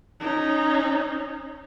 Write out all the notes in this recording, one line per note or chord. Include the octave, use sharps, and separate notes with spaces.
C#4 D#4